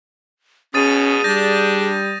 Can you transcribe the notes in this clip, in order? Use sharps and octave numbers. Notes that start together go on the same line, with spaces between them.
B2 C#4 G#4 D#6 A6 D#7
G3 D4 G6 A#6